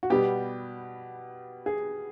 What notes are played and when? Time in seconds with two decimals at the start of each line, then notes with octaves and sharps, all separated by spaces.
0.03 F#4
0.10 B2 G3 B3 G4
1.66 G#4